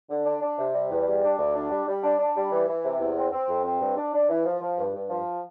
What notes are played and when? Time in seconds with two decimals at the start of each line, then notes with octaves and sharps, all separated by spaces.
0.10 D3
0.26 D4
0.42 D4
0.58 C3
0.74 G3
0.90 E2
1.07 G3
1.23 D4
1.39 D2
1.55 D4
1.71 G3
1.87 G3
2.04 D4
2.20 D4
2.36 G3
2.52 E3
2.68 E3
2.84 C3
3.00 E2
3.17 C4
3.32 C4
3.48 F2
3.65 C4
3.80 G2
3.97 D4
4.13 D4
4.29 E3
4.45 F3
4.61 F3
4.77 G2
4.94 G2
5.10 F3